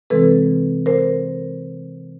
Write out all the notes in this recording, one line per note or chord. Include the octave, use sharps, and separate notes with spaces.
C3 E3 G#3 C4 A4 B4
A#4 C5